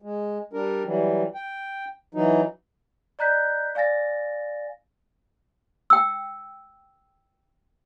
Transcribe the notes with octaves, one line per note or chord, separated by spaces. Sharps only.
G#3
G3 D4 A#4
E3 F#3 G3
G5
E3 F#3 D#4
D5 D#5 A#5 F#6 G6 B6
D5 F5 G#5 A6 A#6
G5 E6